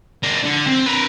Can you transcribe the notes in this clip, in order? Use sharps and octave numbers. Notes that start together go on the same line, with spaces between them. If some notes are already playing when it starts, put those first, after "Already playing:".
D4 A#4
D3
C4
A#4 B4